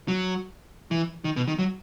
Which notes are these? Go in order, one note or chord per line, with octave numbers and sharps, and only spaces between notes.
F#3
E3
D#3
B2
D#3
F#3